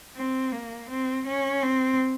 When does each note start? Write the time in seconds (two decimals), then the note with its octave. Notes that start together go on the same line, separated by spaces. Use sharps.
0.16 C4
0.52 A#3
0.89 C4
1.26 C#4
1.63 C4